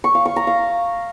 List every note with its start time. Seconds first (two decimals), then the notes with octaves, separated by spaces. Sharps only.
0.04 C#6
0.15 F5
0.26 C#6
0.36 A#5
0.47 F5